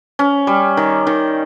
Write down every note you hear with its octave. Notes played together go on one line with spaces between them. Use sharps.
C#4
G3
D#3
D#3